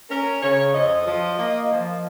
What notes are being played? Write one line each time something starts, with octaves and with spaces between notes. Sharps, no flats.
C#4 A#4
C#3 C#5
F2 D#5
F3
A#3
F3